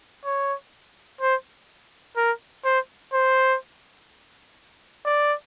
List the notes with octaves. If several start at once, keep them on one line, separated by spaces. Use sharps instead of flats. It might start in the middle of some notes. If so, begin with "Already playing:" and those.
C#5
C5
A#4
C5
C5
D5